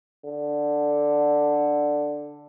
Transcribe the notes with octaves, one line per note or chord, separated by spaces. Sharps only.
D3